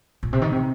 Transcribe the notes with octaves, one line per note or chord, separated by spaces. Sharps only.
A#2
C3
D#3
C3